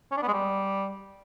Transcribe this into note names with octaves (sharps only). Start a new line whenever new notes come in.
C#4
D4
B3
G#3
G3